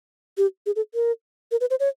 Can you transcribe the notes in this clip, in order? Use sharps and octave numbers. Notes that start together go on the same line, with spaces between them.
G4
G#4
A4
A#4
A#4
B4
C5
C#5